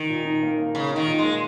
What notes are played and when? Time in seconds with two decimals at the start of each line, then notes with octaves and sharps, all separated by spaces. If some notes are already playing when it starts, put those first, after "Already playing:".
Already playing: D#3
0.09 A#2
0.25 D#4
0.43 A#3
0.58 A#3
0.75 C#3 D#4
0.91 D#3 D#4
1.07 A#2
1.19 G#3 A#3